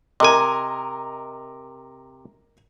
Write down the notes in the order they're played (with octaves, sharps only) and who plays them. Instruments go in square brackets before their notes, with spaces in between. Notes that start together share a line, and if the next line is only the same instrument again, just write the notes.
[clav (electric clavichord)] C3 G#5 [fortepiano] A#4 D#5